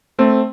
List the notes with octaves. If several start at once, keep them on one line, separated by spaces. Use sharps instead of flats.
A3 C4